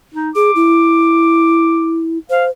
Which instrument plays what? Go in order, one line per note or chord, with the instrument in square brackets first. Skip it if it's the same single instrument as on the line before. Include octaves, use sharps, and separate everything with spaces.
[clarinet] D#4
[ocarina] G#4 [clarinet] D6
[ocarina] E4
[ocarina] C5 [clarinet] F5